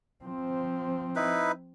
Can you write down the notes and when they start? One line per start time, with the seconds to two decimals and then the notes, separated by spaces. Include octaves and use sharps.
0.24 F3 C4
1.16 D#4 E4 B4